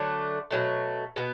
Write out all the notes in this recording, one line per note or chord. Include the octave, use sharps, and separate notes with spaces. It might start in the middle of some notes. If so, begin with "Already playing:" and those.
Already playing: D3 F#3 A3 D4
B2 F#3 A3
B2 B3